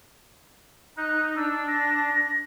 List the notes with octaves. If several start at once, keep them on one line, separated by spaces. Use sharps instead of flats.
D#4 F#6
D4 E6
A#6